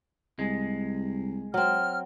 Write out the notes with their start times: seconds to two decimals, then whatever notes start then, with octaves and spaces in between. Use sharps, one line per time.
0.39 C2 G#3
1.54 F#3 C4 F6